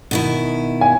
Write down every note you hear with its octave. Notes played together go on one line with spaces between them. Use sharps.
B2 D#3 E4
G#5